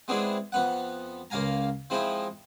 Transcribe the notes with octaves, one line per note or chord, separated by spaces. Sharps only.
G#3 B3 C4 D4 E4 G#4
F2 B3 F#5
C#2 A#3 F5 G#5 A#5
F3 G#3 C4 D#4 E4